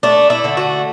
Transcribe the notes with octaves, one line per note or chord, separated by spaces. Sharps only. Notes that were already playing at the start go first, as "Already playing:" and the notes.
A3 D4
E4
D3
F#4